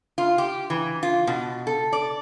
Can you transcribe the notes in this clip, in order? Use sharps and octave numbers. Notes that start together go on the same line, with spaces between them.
F4
G4
E3
F4
B2
A4
D5